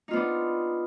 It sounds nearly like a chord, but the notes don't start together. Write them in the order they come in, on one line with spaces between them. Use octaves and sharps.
D#4 F4 B3 D4